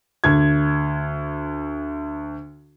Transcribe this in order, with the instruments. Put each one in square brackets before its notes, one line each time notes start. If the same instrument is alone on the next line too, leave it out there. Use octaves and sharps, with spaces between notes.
[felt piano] D2 G#6